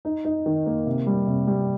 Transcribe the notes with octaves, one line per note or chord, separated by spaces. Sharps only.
D#4
D#4
D#3
A#3
C3
G3
C3
G3